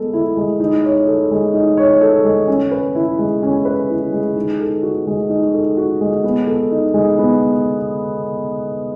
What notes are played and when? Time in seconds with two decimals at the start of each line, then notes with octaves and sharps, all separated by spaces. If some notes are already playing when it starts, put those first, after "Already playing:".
Already playing: G#3 B3 A4
0.13 E4
0.37 G#3
0.60 D#4
0.84 C#5
1.07 A4
1.31 G#3
1.54 D#4
1.77 C#5
2.02 A4
2.25 G#3
2.48 C#4
2.72 B4
2.95 E4
3.19 G#3
3.43 C#4
3.65 B4
3.90 E4
4.12 G#3
4.36 D#4
4.60 A4
4.83 F#4
5.07 G#3
5.29 D#4
5.54 A4
5.77 F#4
6.01 G#3
6.24 B3
6.47 A4
6.71 D#4
6.94 G#3
7.19 B3